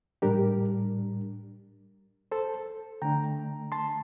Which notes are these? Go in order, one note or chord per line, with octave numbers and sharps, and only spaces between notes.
A2 G3 D4 G4 A#4
A4 C5
D3 A3 D4 G5 A#5
A5 C6